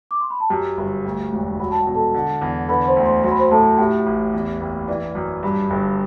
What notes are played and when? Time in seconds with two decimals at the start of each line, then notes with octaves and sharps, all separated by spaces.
0.11 D6
0.21 C6
0.30 B5
0.40 A5
0.50 F#2 G4 G5
0.77 G1
1.05 D2
1.33 E1
1.60 F#3 B5
1.71 A5
1.83 B2 G5
1.95 A4 A5
2.14 D3
2.41 E2
2.69 D3 B4 B5
2.87 C5 C6
2.96 D2
3.05 C5 C6
3.24 F#3 C6
3.31 B5
3.39 C5 C6
3.51 A2 A4 A5
3.78 A2 G4 G5
4.06 A1
4.33 E2
4.61 F#1
4.88 E3 D5
5.15 F#2
5.43 G2
5.70 G1